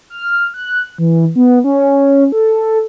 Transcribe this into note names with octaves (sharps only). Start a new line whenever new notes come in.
F6
F#6
E3
B3
C#4
A4